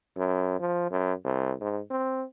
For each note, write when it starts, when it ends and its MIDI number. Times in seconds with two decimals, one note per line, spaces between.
0.17 0.58 42
0.60 0.87 53
0.91 1.13 42
1.25 1.53 36
1.61 1.79 44
1.90 2.24 60